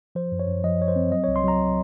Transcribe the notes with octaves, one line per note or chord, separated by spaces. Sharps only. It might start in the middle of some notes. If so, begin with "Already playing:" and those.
F3 C5
F#2
C#5
F#2
F3 D#5
F#2 C#5
C5
C4
F#3 D#5
C2 C#5
C6
F#3 A#5